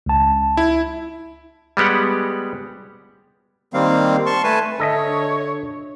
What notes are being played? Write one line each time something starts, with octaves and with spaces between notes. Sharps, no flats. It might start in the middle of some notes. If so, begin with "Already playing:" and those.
C#2 A5
E4
G3 G#3 B3 G4 F#5
D#3 G3 A#3 C4 F5
A5 C6 C#6
A3 B4 G#5 A5
D3 A4 C#5 D#5 E5